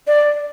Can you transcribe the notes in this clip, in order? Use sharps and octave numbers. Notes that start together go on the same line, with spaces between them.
D5